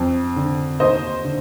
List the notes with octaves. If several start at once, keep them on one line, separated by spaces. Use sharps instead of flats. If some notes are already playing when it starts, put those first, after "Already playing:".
Already playing: F2
D3
D#2 C5 D#5
D3